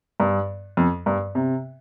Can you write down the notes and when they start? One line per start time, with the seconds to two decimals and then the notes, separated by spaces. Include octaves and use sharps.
0.20 G2
0.77 F2
1.06 G2
1.35 C3